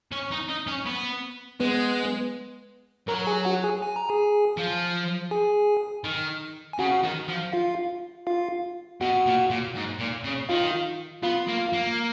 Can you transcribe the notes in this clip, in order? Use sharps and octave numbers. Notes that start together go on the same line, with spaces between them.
C#4
D#4
D#4
C#4
B3
G#3 B3 B4
F#3 A#4 A#5
G#4 G#5
F#4 F#5
G#4 G#5
G#5
A#5
G#4 G#5
F3
G#4 G#5
D#3
G#5
C#3 F#4 F#5
D#3
F3
F4 F5
F4 F5
B2 F#4 F#5
A#2
A#2
G#2
A#2
C#3
D#3 F4 F5
B3 F4 F5
A#3
A#3